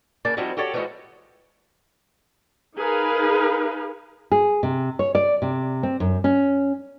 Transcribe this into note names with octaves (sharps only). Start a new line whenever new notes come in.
C#3 A#3 D5 A5
F3 G3 C4 D#4 E4 F#4
F#4 G4 A4 C#5 D5
E3 F3 G3 G#3 F#4 D#5
D#4 G#4 A#4 B4 F5
G#4
C3
C#5
D5
C3
C4
F#2
C#4